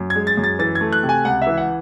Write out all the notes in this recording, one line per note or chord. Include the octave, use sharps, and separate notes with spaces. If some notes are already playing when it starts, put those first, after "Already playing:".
Already playing: F#2
G#6
G#3
A6
F#2
A6
E3 A6
G#6
A3
F#6
C3
G#5
C#2 F#5
E5
E3
F#5